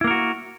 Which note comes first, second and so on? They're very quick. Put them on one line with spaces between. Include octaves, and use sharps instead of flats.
E4 A#3 A#4 F#4